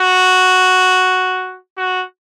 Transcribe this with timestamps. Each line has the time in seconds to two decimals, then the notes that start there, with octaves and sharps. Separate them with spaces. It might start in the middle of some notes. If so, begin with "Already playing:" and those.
Already playing: F#4
1.77 F#4